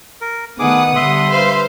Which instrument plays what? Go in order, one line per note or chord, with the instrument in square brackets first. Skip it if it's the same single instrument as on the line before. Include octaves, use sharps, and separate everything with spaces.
[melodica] A#4
[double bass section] D#3 A3 B3 [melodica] G#4 D6 [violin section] F#5 D#6
[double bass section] D3 G3 [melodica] E5 C6
[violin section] B4 C5 F5